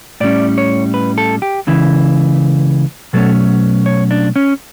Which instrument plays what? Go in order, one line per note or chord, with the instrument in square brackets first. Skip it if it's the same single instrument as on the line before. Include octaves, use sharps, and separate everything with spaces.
[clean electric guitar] A2 G3 C#4 D5
C#5
B4
A4
G4
C#2 C#3 E3
B2 F#3 A3 C#4 A4
C#5
D4
C#4